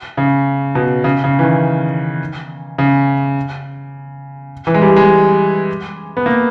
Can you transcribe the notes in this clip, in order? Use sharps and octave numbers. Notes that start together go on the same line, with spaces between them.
C#3
B2
C#3
C#3
E3
D#3
C#3
E3
G#3
G3
G#3
B3
A#3